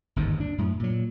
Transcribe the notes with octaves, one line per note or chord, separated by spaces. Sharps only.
G1 D#2 G#2
D4
F#2 A2
A#2 F#3